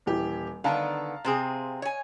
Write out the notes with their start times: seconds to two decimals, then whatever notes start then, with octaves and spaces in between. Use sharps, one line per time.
0.06 D#1 E3 G4
0.64 D3 D#3 B3 F5 A5 A#5
1.25 C3 C4 G#4
1.82 C#5 G#5